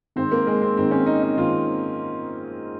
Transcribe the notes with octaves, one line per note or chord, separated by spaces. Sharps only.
G#2 D#3 C4
A#3
G#3
C4
G#2 D#3 C4
C#4
D#4
D#4
G#2 D#3 F4